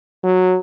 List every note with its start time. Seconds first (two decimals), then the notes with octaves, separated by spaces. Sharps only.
0.24 F#3